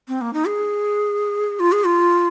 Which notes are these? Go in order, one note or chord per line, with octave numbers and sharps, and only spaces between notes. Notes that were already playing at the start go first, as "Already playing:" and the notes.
C4
A#3
D#4
G#4
F4
G#4
F4